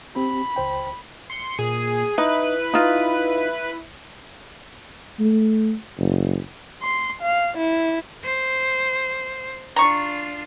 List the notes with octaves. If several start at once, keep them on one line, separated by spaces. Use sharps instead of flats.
C4 G4 B5
C#2 C5 G5
C6 C#7
A#2 G#4
D#4 E4 B4
D#4 F4
A3
F#1
C6
F5
E4
C5
D4 F4 A#5 C#6